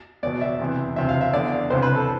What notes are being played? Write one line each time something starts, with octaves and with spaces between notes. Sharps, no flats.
E2 B2 D5
E5
E2 C3 E3
D2 C3 E3 E5
F5
E5
E2 D3 D5
C2 C3 E3 C5
B4
A4